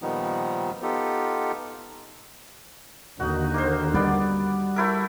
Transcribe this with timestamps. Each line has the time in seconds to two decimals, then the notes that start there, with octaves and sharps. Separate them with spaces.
0.02 A#2 D#3 F3 G3 B3 D#4
0.82 B3 D#4 F4 G4 A4
3.20 D#2 D3 D#3 D#4 F#4
3.54 A#3 C5
3.94 G3 B3 D5
4.76 A3 E4 A#4